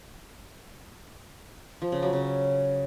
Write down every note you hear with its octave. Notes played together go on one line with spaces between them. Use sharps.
F3
C#3
F#3
C#3